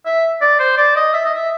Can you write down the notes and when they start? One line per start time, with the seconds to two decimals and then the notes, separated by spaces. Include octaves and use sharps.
0.06 E5
0.41 D5
0.59 C5
0.77 D5
0.96 D#5
1.13 E5
1.25 D#5
1.35 E5